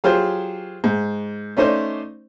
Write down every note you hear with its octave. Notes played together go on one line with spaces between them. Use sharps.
F#3 F4 G4 G#4 C5
G#2
A3 C#4 D#4 C5 D5